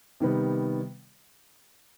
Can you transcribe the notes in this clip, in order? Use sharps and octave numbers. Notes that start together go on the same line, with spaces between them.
C3 D#3 G3 B3